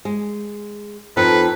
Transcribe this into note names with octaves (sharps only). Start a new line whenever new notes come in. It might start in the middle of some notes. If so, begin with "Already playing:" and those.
G#3
F2 D#4 A4 B4